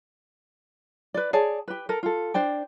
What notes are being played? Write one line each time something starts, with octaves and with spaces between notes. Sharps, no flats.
B4 D5
G#4 C#5 D5 A5
G4 B4
A4 A#4
F4 A4
D4 C5 D5 G5